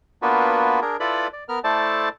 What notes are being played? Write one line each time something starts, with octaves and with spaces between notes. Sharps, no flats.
A#3 B3 D4 F4 F#4 B4
D4 G#4 A#4
E4 F4 A4 B4 D5 B5
D5
B3 A#4 F6
A3 E4 A4 C5 D5 A5